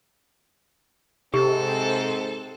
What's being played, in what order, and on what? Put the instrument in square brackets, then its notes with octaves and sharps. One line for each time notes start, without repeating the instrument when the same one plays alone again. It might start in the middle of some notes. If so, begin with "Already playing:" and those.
[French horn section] G#2 C4 [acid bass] C3 [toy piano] G4 [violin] A4